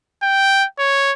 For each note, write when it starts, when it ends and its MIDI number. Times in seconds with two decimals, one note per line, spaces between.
0.23 0.65 79
0.79 1.12 73